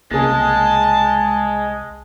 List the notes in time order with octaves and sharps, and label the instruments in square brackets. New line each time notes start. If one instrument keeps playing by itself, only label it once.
[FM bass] C2 [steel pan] C#3 A#3 G#4 [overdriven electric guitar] G#3 [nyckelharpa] A5